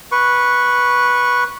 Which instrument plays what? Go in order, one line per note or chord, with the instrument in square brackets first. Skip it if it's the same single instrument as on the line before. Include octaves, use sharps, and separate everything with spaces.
[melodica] B4 C#6